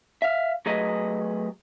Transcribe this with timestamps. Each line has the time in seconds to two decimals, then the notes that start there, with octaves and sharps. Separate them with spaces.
0.22 E5 F5
0.66 F#3 A3 G#4 B4 D#5